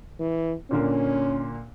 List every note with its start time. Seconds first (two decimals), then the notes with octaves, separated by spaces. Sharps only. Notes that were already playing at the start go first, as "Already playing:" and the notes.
0.20 E3
0.71 A#2 D3 A#3 C#4